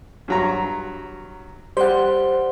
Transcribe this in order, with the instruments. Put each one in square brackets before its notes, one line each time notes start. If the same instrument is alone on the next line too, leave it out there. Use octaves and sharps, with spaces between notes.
[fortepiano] G2 F#3 A#5
[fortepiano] G3 [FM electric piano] C5 F#5